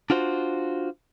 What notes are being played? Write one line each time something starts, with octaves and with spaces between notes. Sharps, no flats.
D4 F4 F#4 C5